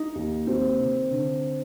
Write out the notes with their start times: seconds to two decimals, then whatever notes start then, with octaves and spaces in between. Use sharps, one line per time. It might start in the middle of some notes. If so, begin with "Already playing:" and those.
Already playing: D#4
0.15 D#2
0.47 D#2 C4
0.79 D#3
1.11 D3